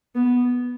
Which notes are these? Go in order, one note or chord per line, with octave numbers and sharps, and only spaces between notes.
B3